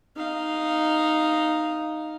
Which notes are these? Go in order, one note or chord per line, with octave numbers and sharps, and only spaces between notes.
D#4 F5